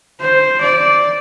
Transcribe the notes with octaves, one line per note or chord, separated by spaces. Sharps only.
C5
D5